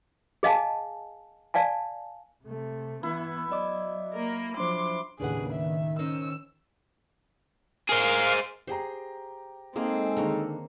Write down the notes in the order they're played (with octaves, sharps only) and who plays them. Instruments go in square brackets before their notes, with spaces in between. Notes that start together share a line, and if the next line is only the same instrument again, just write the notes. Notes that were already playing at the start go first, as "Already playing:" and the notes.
[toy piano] G#4 D#5 F5 G#5 A5
D5 F5 G#5 A5
[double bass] C3 A3
[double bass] E3 B3 [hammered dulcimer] E4
[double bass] F#3 [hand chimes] D5 D#5 D6
[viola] A#3 A#4
[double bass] F3 F#3 [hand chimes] D4 C5 [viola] C6 D6
[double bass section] D#2 A2 C#3 [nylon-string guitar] D4 B4 F#5 [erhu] G#4
[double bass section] D#3 [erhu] E5
[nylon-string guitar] C#4 D#4 C5 [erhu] E6
[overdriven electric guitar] G#4 C5 [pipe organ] A#4 F5
[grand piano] G4 G5 A#5 [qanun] G#4 C5
[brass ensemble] G#3 D#4 A4 [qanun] A#3 G#4 [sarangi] C4
[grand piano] D3 D#3 [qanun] A#3 A#4 C#5